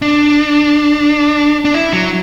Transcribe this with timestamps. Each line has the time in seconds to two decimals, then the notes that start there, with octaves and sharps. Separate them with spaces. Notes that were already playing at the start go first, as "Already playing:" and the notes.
0.02 D4
1.65 D4
1.74 E4
1.93 F#3